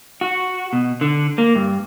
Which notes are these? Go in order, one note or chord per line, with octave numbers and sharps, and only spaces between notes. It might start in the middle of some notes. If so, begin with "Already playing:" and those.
F#4
B2
D3
A#3
G2